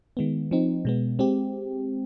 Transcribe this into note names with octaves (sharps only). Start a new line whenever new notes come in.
D#3 G#3 B3
F3 C4 D#4
B2 G#3 B3
G#3 C4 G4